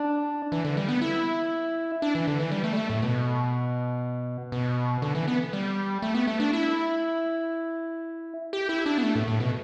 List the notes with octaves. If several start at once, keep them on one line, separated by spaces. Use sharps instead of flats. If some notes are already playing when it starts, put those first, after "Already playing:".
Already playing: D4
E3
D3
G3
B3
E4
D4
E3
D3
E3
G3
A3
G3
A3
A2
B2
B2
D3
E3
B3
G3
A3
B3
A3
D4
E4
G4
E4
D4
B3
A3
A2
A2
B2